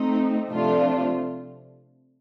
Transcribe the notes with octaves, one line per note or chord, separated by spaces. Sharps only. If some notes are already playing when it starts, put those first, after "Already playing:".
Already playing: A3 C4 D#4
C3 F3 A3 D4 F4